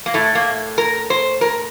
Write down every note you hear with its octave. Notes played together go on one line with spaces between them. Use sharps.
A#3
A2 A3
A#3
A#4
C5
A#4